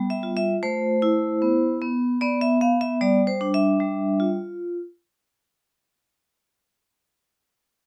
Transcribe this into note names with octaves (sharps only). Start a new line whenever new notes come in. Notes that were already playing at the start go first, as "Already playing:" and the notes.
Already playing: G3 B3
E5
F4
E5
A3 C5
E4
B3
B3
B3 D5
E5
B3 F5
E5
G3 D5
C5
D4
E5
G3
F4